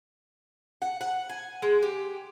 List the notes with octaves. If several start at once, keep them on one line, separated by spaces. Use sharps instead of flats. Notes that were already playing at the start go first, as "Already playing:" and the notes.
F#5
F#5
G#5
G#3
G4